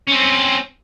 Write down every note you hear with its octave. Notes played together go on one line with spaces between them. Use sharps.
C4 C#4